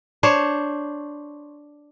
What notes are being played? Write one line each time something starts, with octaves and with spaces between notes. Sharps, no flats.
D4 C5 C#5